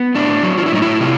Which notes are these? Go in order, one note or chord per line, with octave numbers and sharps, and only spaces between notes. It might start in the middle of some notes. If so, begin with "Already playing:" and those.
Already playing: B3
A2 D4
F#3
F4
E4
A2 D#4
E4
C3 F4